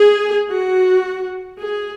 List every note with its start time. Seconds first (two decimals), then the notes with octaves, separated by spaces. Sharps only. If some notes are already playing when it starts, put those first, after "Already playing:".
Already playing: G#4
0.50 F#4
1.60 G#4